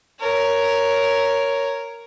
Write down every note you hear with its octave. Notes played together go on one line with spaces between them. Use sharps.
A#4 C#5